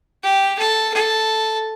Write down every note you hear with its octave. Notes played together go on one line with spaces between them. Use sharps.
G4
A4
A4